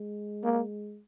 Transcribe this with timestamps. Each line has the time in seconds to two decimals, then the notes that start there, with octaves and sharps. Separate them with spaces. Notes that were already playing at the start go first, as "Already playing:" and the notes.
Already playing: G#3
0.44 A#3